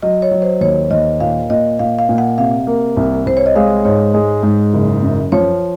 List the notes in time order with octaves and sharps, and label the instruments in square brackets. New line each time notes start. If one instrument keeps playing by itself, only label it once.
[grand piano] F#3 [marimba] D#5
[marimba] C#5
[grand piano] F#3
[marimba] C5
[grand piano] D#2 [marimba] C#5
[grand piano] D#2 [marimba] D#5
[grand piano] A#2 [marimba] F5
[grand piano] A#2 [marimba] D#5
[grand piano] A#2 [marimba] F5
[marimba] F5
[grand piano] A#2
[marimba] F#5
[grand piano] C3 [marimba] F5
[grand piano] A#3
C2
[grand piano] C2 [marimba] C5
[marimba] C#5
D#5
[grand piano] G#3 [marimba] F5
[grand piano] G#2 [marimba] C#5
[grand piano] G#3
G#2
F#1
F#2
[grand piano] F3 [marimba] C#5